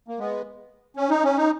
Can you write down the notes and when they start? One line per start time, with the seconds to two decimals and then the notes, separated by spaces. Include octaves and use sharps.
0.08 A#3
0.19 G#3 B3
0.96 C#4
1.10 D#4
1.24 C#4
1.37 D#4